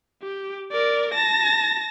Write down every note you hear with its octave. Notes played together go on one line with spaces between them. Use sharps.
G4
A#4 D5
A5 A#6